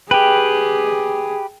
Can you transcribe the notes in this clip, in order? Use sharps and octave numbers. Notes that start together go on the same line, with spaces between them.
G4 G#4 B4 G5